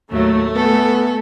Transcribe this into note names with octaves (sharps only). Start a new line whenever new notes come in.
D#2 A2 F#3 A3
B3 A4 G#5